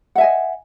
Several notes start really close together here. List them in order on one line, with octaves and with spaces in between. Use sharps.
F#5 E5 G#5 D#5